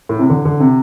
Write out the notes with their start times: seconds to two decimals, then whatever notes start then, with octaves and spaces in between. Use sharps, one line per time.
0.09 A2
0.19 C3
0.30 D3
0.45 D3
0.60 C3